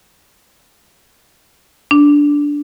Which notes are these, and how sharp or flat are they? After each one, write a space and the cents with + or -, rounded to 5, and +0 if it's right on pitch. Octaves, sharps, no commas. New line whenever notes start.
D4 -10